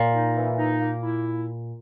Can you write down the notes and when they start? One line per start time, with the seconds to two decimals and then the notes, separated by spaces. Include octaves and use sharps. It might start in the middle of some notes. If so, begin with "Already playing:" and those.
Already playing: A#2
0.13 D#4
0.35 E3
0.57 D#4
0.80 A#3
1.03 E4